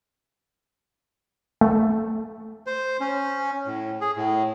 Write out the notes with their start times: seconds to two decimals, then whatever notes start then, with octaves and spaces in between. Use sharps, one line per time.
1.61 A3
2.67 C5
3.00 C#4
3.66 A2
4.01 G#4
4.17 A2